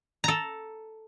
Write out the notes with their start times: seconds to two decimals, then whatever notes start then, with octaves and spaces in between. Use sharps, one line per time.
0.24 A4 A#5